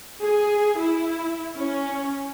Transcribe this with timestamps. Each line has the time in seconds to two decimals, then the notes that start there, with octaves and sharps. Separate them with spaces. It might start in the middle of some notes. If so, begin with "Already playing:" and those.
0.23 G#4
0.80 E4
1.58 C#4